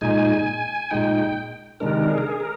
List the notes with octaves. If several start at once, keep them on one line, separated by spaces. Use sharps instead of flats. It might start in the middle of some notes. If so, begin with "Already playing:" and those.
A#2 G#3 D#4 G#5
A#2 G#3 D#4 G5
C3 D#3 G#3 D4 A#4
G#4
A#4
G#4
A#4